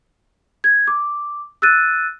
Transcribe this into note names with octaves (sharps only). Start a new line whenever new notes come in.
G#6
D6
E6 F#6 A6 D#7